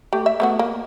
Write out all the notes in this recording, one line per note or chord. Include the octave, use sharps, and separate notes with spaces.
A3 G4
E5
A3 B3 F#4
A#3